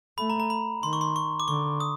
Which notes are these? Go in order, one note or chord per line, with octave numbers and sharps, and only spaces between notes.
A3 B5
A#5
A#5
B5
D#3 C6
C#6
C6
C#6
D6
D3 C#6
D#6